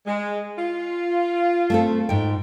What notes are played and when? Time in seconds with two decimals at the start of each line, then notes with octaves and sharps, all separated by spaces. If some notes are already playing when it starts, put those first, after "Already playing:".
0.06 G#3
0.58 F4
1.70 A3 C4 A4
2.09 G#2 G5